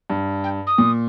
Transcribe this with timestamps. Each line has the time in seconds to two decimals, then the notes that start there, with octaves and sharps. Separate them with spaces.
0.10 G2
0.44 G5
0.67 D#6
0.78 A#2